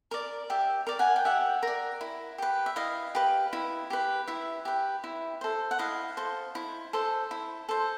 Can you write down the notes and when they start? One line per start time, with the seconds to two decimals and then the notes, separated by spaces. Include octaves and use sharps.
0.11 A#4 D5
0.50 G4 E5
0.87 A#4 D5
0.99 F#5 G#5
1.16 G5
1.25 G4 E5 F#5
1.63 A#4 D5
2.01 E4
2.38 G4 B4
2.66 E5
2.76 E4 D#5 F5
3.15 G4 B4
3.53 E4
3.90 G4 B4
4.27 E4 E5
4.65 G4 B4
5.04 E4
5.41 A4 C5
5.71 F#5
5.79 E4 D#5 F5
6.17 A4 C5
6.55 E4
6.93 A4 C5
7.31 E4
7.69 A4 C5